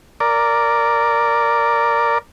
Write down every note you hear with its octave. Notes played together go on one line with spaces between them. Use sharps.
A#4 D5